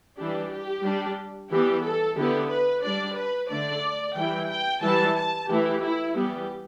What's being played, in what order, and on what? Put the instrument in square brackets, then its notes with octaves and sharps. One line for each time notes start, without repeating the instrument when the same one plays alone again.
[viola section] E3 G3 D4 G4
G4
G3 D4
E3 G3 B3 G4
A4
D3 B3 E4 G4
B4
G3 D4 D5
B4
D3 A3 D4 D5
E3 G3 E4 G5
G5
E3 G3 E4 A5
A5
E3 A3 E4 G4
E4
E3 G3 B3 G4